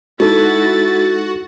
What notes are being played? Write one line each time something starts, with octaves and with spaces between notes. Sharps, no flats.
G#3 D#4 E4 F#4 A4 A6